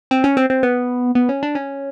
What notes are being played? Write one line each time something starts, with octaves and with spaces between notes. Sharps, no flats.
C4
C#4
C4
C4
B3
B3
C#4
D4
C#4